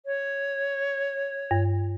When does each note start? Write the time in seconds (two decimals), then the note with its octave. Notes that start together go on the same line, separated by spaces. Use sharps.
0.06 C#5
1.51 G2